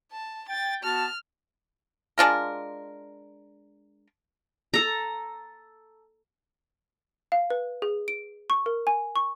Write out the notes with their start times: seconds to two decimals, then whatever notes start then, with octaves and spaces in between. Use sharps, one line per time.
0.12 A5
0.49 G5 A6
0.84 B3 F#4 A5 F6
2.18 G#3 D4 F4 A#4
4.74 A4 A#5
7.32 F5
7.50 B4
7.82 G#4
8.08 D7
8.50 C#6
8.66 A#4
8.87 G#5
9.16 C#6